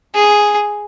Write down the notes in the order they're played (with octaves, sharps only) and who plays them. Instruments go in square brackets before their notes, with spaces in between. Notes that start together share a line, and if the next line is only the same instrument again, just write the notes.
[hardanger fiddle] G#4